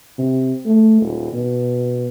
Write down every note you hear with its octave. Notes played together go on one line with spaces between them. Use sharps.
C3
A3
D#1
B2